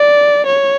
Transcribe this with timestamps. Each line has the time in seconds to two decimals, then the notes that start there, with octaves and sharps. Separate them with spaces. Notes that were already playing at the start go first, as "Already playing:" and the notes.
Already playing: D5
0.47 C#5